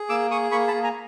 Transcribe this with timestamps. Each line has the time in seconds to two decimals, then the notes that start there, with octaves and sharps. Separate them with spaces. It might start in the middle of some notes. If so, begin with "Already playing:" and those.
Already playing: G#4
0.09 A#3 D6 E6
0.31 G#4 C#6 D#6
0.52 A#3 B5 C#6
0.68 A5 B5
0.73 A#3
0.83 G#5 A#5